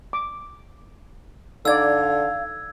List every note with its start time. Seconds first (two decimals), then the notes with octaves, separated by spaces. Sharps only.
0.13 D6
1.65 D3 D#4 D5 F5 E6 G#6